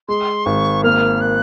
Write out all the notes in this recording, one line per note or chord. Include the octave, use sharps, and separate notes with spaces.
G#3 C6
G#1 C#6
A#3 F6
F#6